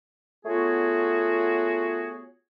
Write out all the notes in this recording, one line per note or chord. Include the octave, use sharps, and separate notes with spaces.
A3 B3 F4 F#4 G#4 C#5